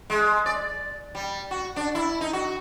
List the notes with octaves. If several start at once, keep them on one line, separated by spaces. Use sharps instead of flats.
G#3
D5
G3
F#4
D4
E4
D#4
F#4